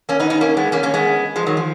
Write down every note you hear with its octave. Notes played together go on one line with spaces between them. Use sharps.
A#3 C#4
B3 D#4
B3 D#4
A#3 C#4
G#3 B3
A#3 C#4
A#3 C#4
G#3 B3
F3 G#3
D#3 F#3
F3